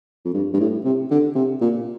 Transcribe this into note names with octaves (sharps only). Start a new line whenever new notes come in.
F2
G2
G2
A2
C3
D3
C3
A#2